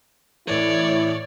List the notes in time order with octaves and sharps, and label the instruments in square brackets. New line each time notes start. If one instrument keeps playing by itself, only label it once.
[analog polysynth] A2 E3 [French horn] E4 [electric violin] C#5 D5